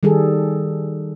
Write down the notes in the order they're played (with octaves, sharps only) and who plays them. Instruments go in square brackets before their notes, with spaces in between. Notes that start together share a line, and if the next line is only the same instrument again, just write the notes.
[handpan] D#3 G3 G#4 A4